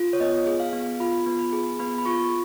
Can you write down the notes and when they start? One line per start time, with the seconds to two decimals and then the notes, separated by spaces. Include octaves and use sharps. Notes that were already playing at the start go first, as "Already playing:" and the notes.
Already playing: F4
0.13 C#5
0.20 B3 D#5
0.47 G#4
0.60 F5
0.73 B3
1.00 F4 B5
1.26 B3
1.39 B5
1.53 G#4
1.79 B3 B5
1.98 B5
2.05 F4 C#6